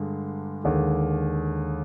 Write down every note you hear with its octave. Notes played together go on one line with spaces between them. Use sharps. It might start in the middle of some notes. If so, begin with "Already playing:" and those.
Already playing: G2 D3 G#3
D#2 D3 G#3